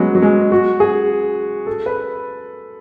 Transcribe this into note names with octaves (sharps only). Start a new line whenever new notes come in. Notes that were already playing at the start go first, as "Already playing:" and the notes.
Already playing: F#3 G#3 B3 C#4
F#3
G#3
F#4
G#4
A4
B4